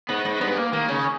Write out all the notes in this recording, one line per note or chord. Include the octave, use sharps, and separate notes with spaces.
G#2 B3
G#2
G2 B3
A#3
D#3 A#3
C#3 C#4